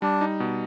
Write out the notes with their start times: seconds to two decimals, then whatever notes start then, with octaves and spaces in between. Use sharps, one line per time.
0.02 G3 D4
0.21 D#4
0.40 B2